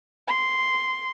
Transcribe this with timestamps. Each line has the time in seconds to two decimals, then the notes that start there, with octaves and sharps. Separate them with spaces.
0.27 C6